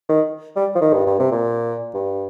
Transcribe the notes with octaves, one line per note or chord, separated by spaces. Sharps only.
D#3
G3
F3
D#3
G2
G2
C3
A#2
G2